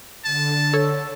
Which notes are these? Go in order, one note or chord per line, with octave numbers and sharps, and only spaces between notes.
D3 A5
A4 C#5 E6